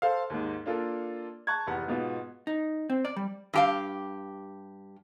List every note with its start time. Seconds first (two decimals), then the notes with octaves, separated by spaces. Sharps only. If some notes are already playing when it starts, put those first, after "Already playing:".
0.02 A4 C5 F5
0.30 D#2 G#2
0.66 A#3 D4 F4 A4
1.47 A5 C#6 F#6 G#6
1.67 F1 E2 G4 F#5
1.88 G#2 B2 B3 F4
2.47 D#4
2.90 C4
3.05 D5
3.16 G3
3.54 G2 G4 F5